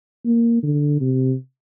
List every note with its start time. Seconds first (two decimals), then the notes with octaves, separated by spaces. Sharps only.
0.25 A#3
0.63 D3
1.01 C3